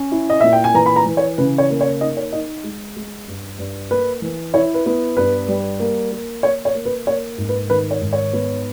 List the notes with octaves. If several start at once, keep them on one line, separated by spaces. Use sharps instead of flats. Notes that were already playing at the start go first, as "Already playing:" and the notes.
Already playing: C#4
E4
D#5
A#2 E5
G5
G#5
E3 A#5
B5
A#5
E3
C#5
C#3 B4
C#5
A#3
C#5
D#4 D#5
C#5
D#4 D#5
G#3
G#3
G2
G2
A#3 B4
E3
E4 C#5
B4
B3
G2 B4
G3
A#3
A#3
A#3 C#5
C#5
A#3
B4
A#3 C#5
G#2
B4
D#3 B4
C#5
G#2
C#5
B3